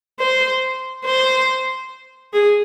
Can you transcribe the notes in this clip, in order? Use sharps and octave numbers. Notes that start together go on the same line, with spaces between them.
C5
C5
G#4